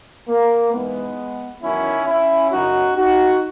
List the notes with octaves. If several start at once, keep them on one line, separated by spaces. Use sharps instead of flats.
A#3
G#2 E3 G#3 B3
E2 D#3 F#3 C#4 E4
C#4 E4
F#2 C#3 F#3 D#4 F#4
D#4 F#4